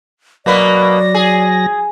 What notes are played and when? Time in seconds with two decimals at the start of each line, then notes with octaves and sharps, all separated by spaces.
0.46 B2 F#3 A#3 B4 D5 A#6
1.15 G#4